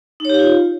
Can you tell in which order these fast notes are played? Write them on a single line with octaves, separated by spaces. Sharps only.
D#4 C#5 G4 F5 F4